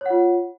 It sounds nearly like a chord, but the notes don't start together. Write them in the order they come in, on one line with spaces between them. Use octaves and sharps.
C#5 F#5 F4